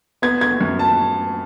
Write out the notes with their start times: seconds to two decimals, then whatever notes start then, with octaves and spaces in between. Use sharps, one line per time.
0.22 B3 G#6
0.41 G#6
0.61 F#2
0.79 A5